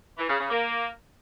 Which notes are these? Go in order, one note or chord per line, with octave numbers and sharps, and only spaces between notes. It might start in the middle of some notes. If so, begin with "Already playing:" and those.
E3
C#3
C#3
A#3